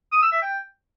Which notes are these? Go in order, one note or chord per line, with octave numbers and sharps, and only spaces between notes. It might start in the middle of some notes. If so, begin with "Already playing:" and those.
D#6
E6
E5
G5